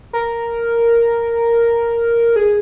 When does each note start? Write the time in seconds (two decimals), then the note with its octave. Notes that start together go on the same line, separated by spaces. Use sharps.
0.13 A#4
2.36 G#4